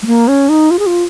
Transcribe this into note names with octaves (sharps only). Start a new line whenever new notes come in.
G#3
A#3
C#4
D#4
F4
G#4
F4